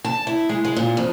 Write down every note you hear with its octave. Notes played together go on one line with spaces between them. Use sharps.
A5
E4
G#3
G#3
A#2
F2